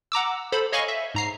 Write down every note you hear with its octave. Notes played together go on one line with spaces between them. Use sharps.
F#5 A#5 D6 E6
A4 C5 B5
C#5 D#5 F5 G#5 B5 C#6
E5
G#2 A#5 C7